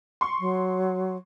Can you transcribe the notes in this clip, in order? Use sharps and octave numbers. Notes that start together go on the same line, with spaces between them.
C6 C#6
F#3